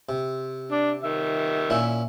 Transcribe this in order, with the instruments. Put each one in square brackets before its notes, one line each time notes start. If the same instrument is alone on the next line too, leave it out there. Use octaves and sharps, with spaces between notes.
[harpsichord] C3
[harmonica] D4
D#3 E5
[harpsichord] A#2 C#4 E4